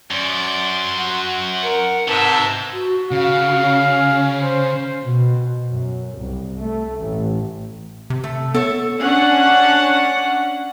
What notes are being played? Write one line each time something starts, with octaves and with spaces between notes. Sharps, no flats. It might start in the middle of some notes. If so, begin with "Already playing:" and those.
F#2 D5 C6
F#4
A#4 F#5
G#2 C3 B4 E5 A5
F#4
C#3 F5
C#4
C5
B2
F#2
C2
A3
A1
C3
A3
B3 A4 C#5
C#4 D4 F#5